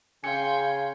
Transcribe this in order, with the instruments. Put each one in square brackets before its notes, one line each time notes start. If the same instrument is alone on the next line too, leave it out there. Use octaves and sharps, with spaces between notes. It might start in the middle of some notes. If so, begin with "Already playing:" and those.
[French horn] C#3 [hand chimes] F5 C#7 [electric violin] G5 C6 [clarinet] G#5